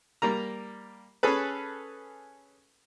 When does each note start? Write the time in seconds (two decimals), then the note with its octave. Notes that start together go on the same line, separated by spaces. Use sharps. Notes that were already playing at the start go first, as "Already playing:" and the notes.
0.22 G3 A#3 A#5
1.23 C#4 G#4 A4 B4